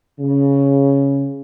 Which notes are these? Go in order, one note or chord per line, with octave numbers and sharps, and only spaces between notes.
C#3